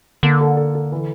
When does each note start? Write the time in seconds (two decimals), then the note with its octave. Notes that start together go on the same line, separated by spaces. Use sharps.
0.23 D3 A#3
0.41 A4
0.57 A4
0.75 A4
0.92 E3